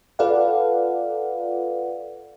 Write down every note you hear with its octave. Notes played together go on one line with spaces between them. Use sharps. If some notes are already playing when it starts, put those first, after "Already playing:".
F4 A4 B4 D5 F5 F#5